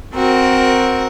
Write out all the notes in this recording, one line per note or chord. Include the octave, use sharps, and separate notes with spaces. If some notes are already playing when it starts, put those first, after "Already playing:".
C4 F#4 A#4